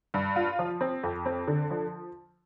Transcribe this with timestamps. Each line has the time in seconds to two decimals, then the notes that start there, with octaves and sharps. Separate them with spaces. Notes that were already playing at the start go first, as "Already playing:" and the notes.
0.14 G2
0.36 F4
0.59 F3
0.81 C4
1.03 F2
1.26 C4
1.47 D3
1.70 F3